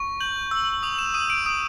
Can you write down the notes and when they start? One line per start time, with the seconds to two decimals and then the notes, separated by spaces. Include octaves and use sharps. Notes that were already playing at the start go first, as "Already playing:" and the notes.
Already playing: C#6
0.20 G6 F#7
0.51 E6
0.83 D#6 F7
0.98 E7
1.14 D#6 D#7
1.30 D7
1.46 D#6 D7